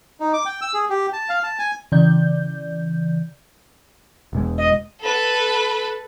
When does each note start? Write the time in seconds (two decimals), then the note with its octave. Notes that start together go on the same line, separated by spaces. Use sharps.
0.20 D#4
0.33 D6
0.45 G5
0.62 E6
0.74 G#4
0.90 G4
1.13 A5
1.29 F5
1.43 A5
1.59 G#5
1.92 C#3 E3 D5 G6
4.33 E1 B2 G#3
4.58 D#5
5.00 A4 B4